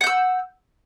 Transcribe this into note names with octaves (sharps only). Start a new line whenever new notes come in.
F#5 E6 G6